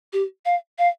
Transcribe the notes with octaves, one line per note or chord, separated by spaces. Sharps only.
G4
F5
F5